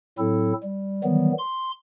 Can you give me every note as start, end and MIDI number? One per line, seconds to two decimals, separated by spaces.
0.18 0.53 45
0.18 0.53 54
0.18 0.53 60
0.18 0.53 64
0.18 0.53 69
0.63 1.01 55
1.04 1.32 51
1.04 1.32 52
1.04 1.32 54
1.04 1.32 55
1.04 1.32 59
1.39 1.72 84